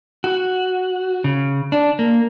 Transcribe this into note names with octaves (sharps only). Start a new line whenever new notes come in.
F#4
C#3
D4
A#3